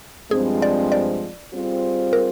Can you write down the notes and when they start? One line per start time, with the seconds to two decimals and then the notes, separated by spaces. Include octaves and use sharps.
0.31 G2 F3 G#3 C4 G#4
0.62 D5
0.92 D5
1.52 G3 C4 F4 G#4 C5
2.13 A#4